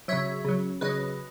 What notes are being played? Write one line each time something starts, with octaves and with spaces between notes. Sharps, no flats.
C#3 F#3 C#5 E5
C#3 F#3
C#3 F#3 B4 D#5